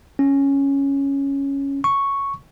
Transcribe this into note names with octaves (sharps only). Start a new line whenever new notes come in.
C#4
C#6